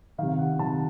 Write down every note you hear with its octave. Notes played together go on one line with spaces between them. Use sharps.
C3 D#3 F5
F5
F#5
C3 D#3 A5